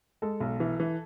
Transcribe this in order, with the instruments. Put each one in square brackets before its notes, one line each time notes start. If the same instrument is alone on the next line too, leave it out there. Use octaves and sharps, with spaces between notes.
[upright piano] G#3 A4
B1
E3
E3